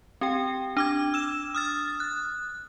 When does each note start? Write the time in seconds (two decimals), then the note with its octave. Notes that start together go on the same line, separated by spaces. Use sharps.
0.21 C4 G4 G5
0.77 D4 D6 G#6
1.14 E6 E7
1.55 D#6 F6 A6
2.00 F#6